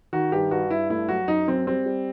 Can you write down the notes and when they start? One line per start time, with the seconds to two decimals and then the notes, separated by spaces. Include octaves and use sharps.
0.13 D#3 F#4
0.32 G2 G4
0.51 G2 F#4
0.70 G2 E4
0.90 A3 E4
1.09 F#3 F#4
1.28 F#2 D#4
1.48 F#2 C4
1.67 G3 C4
1.86 G3